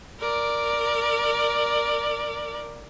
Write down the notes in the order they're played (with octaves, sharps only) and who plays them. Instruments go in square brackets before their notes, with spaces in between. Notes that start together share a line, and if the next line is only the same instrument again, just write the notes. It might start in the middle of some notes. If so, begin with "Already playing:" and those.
[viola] A#4 D5